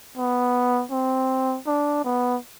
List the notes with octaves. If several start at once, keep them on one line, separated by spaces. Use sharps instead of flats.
B3
C4
D4
B3